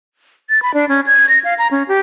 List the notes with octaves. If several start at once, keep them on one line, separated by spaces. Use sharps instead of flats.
A6
B5
D4
C#4
G#6
A#6
F5
A#5
C#4
G4